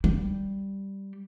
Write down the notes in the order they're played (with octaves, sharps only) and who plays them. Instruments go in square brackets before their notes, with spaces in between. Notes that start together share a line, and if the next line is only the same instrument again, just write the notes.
[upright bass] G3